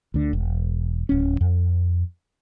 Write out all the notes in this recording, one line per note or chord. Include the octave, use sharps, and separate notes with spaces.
D2 D3
E1
D1 C#4
F2